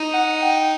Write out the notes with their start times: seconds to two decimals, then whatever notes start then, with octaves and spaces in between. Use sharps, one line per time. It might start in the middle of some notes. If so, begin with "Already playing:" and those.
Already playing: D#4
0.14 F#5
0.42 G5